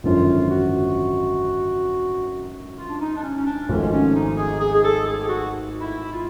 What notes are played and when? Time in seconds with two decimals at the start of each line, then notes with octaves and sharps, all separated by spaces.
0.03 G#1 F#2 D3 F3 F4
0.49 F#4
2.77 F4
2.89 D4
3.00 D#4
3.16 D4
3.23 C#4
3.36 C#4
3.46 D4
3.69 G#1 G#2 F3 A3 C#4
3.91 C#4
4.14 D#4
4.37 G#4
4.61 G#4
4.74 G#4
4.83 A4
5.06 G#4
5.20 G4
5.28 F#4
5.81 E4
6.12 F4